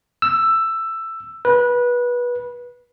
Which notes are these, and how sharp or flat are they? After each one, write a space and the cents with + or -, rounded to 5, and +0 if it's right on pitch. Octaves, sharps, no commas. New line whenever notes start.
E6 +10
B4 -20